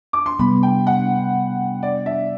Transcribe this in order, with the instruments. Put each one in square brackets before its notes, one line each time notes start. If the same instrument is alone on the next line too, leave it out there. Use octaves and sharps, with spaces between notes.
[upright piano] D6
C6
[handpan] C3 G3 B3 [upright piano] B5
[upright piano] G5
F#5
D5
E5